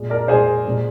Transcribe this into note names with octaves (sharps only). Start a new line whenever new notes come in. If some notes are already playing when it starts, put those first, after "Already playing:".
Already playing: A#2 G#3
A#4 D5
A#2 G#3 G#4 C5
A#2 G#3